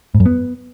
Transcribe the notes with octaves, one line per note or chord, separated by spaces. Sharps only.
G#2
F#2
B3